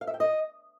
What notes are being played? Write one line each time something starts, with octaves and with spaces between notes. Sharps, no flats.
F5
E5
G5
D#5